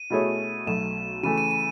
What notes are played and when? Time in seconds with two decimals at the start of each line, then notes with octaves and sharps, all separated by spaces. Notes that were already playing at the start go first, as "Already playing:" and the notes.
Already playing: D#7
0.10 B2 A3 E4 G#4 C#5
0.66 B1 B2 A3 E7
1.23 C#3 E3 A3 D#7
1.38 D#7
1.51 D#7